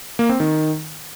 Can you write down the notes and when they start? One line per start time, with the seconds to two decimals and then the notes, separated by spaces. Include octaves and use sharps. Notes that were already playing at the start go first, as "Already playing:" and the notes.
0.19 A#3
0.29 C4
0.40 D#3